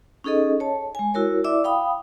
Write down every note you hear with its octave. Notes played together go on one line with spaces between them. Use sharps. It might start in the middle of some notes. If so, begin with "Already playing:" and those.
C#4 D#4 G#4 A4 D#5
C#5 A5
G#3 G#5
E4 F#4 A#4 C#5
E4 D5 E5 D6
F5 G5 B5 D#6